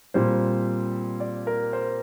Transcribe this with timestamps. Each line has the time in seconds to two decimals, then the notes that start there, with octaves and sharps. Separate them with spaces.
0.14 A#2 G3 C4 C5
1.20 D5
1.47 A#4
1.73 C5